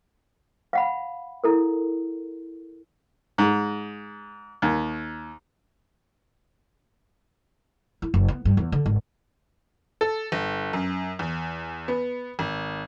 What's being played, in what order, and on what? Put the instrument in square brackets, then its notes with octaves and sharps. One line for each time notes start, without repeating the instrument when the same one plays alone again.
[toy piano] F5 F#5 B5
E4 A4 A#4
[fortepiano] G#2
D#2
[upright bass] E4
F#1
B3
G2
E2
D3
G#1
[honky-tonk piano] A4
G1
F#2
E2
B3
G#1